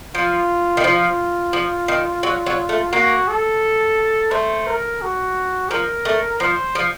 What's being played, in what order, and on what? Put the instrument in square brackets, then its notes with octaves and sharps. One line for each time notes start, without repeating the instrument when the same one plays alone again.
[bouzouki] F3 [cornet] F4
[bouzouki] D#3
[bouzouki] F3 [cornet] F4
[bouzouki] F3
D#3
F#3
F#3
A3
[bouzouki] A#3 [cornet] F#4
[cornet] A4
[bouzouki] A3 [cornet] C5
[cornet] A#4
F#4
[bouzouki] F3 [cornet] A#4
[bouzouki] A3
[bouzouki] F3 [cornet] C5
[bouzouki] F3